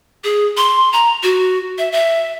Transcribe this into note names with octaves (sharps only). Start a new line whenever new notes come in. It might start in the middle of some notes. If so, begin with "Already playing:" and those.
G#4
C6
A#5
F#4
E5
E5